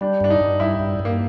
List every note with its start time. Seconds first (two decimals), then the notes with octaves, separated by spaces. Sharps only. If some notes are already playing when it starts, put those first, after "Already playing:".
0.01 G3 D4
0.20 G2 D4
0.30 D#4
0.40 G2
0.60 G3 E4
0.79 G2
0.99 G2
1.05 A#3